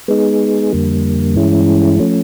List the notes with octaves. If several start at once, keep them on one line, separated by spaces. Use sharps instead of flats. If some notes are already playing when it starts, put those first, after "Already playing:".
G#3 B3 D#4 G#4
F2 D3 G3 A#3
G2 E3 G#3 C#4 E4
F3 A3 C#4